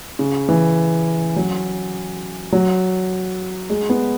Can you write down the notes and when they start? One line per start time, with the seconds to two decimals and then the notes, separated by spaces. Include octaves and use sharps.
0.19 C#3
0.49 E3
1.36 F#3
2.52 F#3
3.70 G#3
3.90 B3